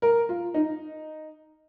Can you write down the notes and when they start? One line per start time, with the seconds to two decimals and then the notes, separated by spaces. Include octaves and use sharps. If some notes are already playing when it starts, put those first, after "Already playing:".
0.02 A#4
0.29 F4
0.54 D#4